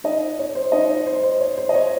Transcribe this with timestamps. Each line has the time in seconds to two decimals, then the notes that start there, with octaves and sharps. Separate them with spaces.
0.04 D#4 D#5
0.39 C#5
0.55 C5
0.72 D#4 D#5
0.90 C#5
1.07 C5
1.23 C5
1.40 C#5
1.58 C5
1.69 D#5
1.74 C#5